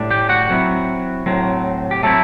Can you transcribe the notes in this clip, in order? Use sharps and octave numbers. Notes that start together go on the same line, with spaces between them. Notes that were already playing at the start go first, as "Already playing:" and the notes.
Already playing: A2 G3 D4
G4 G5
F#4 F#5
F#3 C4 E4
A2 F#3 C4
G4
F#3 A3 C4 E4 A4